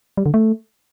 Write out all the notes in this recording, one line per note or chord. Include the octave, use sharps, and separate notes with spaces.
G3
D3
A3